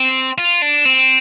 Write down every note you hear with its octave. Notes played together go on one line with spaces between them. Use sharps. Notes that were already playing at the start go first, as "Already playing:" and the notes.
Already playing: C4
F4
D4
C4